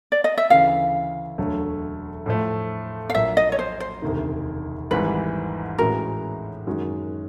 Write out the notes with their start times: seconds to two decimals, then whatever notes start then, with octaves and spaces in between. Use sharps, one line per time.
0.12 D5
0.24 D#5
0.38 E5
0.50 D2 C#3 E3 F5
1.38 E1 D2 D3 F#3 A3
2.26 A2 F3 A3
3.10 F5
3.14 A#1 A#2 F#3 A#3 E5
3.37 D#5
3.52 C#5
3.59 C5
3.80 C5
4.02 E1 D2 C3 D#3
4.91 G#1 G#2 E3 G3 B4
5.78 A2 E3 G#3 C#4 F#4 A#4
6.66 F#2 D#3 G#3 C#4 F#4